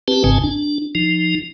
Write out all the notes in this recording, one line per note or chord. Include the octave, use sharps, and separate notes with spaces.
C4 G4 B4 A5
G#1 G#2 C#3 C4 G#5 A5
D4
F3 D#4